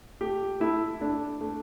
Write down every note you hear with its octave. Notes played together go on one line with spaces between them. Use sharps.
A3 G4
A3 E4
A3 D4
A3